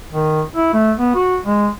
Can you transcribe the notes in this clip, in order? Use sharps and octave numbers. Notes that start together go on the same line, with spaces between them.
D#3
E4
A3
B3
F#4
G#3